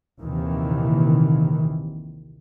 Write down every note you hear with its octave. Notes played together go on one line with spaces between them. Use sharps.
A#1 D#2 C3 D#3 E3